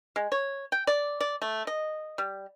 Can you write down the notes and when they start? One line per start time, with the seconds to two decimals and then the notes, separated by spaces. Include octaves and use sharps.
0.16 G#3
0.32 C#5
0.72 G5
0.87 D5
1.20 D5
1.42 A3
1.67 D#5
2.18 G3